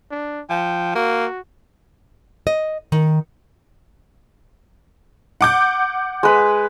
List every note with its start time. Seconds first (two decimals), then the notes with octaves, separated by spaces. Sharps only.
0.11 D4
0.50 F3 G5
0.95 A#3 F#4
2.47 D#5
2.92 D#3
5.41 F#5 D6 G6
6.23 G#3 B4